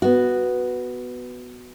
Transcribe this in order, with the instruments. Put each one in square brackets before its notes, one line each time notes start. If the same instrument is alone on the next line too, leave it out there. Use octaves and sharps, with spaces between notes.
[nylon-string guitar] B3 F#4